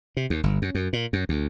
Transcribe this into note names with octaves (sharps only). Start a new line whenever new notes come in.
C3
D#2
G1
F#2
F#2
A#2
F#2
D2